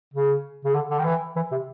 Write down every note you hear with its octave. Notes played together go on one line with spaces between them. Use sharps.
C#3
C#3
D3
D3
D#3
E3
E3
C3